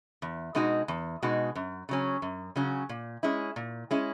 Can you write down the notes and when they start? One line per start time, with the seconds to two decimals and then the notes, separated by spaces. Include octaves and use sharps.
0.22 E2
0.55 B2 G#3 D#4 F#4
0.88 E2
1.23 B2 G#3 D#4 F#4
1.55 F#2
1.89 C#3 F#3 C#4
2.22 F#2
2.56 C#3 F#3 C#4
2.89 A#2
3.23 G#3 C#4 E4
3.56 A#2
3.91 G#3 C#4 E4